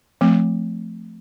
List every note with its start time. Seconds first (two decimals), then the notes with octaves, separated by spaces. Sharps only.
0.21 F3 A3 C4